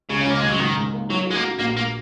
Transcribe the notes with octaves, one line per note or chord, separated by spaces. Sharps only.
C#2 C#3
C#4
C#2 A#3
C#2 G#3
F#3
G#2 D#3
G#2
A#3
F#3 F#4
G#3 F#4
A#3
F#4
A#1 A#3
A#3